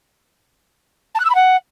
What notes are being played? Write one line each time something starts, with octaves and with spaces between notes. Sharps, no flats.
A5
F#6
E6
B5
F#5